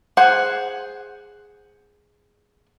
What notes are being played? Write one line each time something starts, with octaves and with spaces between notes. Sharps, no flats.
G#4 C5 F#5